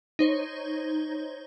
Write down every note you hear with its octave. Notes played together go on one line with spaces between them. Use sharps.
D#4 C5 C#5